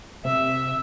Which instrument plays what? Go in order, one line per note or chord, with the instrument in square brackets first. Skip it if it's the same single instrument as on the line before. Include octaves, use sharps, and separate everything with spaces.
[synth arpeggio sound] C3 [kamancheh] E5